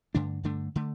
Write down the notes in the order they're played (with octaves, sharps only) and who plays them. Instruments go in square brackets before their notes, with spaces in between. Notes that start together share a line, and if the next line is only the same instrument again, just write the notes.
[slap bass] G2 D3 A3 D4
G2 D3 A3 D4
D3 A3